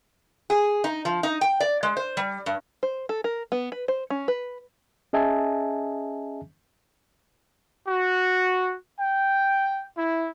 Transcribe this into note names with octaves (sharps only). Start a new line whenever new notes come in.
G#4
D#4
F3
D#4
G5
D5
G#3
C5
G3
G2
C5
A4
A#4
B3
B4
C5
C#4
B4
C#4 G#4 D#5 E5 G#5 A5
F#4
G5
E4